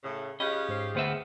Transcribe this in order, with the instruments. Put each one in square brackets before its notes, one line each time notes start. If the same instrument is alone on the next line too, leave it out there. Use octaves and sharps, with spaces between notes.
[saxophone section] A2 C#3
[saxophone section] C#4 F4 G4 [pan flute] G#4 [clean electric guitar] D#5 [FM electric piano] B5 F#6
[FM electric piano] G#2 C5 C7
[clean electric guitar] D2 B3 E5 [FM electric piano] C5 G5 F6